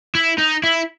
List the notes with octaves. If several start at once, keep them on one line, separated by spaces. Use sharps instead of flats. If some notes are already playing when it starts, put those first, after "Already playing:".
E4
D#4
E4